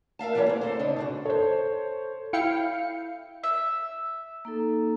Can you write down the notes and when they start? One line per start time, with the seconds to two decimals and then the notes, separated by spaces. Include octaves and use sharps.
0.19 A#4 E5 F5 A5
0.35 E3 G3 B3 G4 C#5
0.47 A#3 C4
0.61 D2 A4 C5
0.79 C#3 D4 D#4
0.97 B2 D3 F#4
1.25 A4 C5 C#5
2.33 E4 F5 G5 C#7
3.43 E5
4.45 A#3 D#4 A4